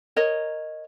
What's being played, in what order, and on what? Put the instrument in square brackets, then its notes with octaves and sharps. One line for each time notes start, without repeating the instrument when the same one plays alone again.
[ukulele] A#4 C#5 D#5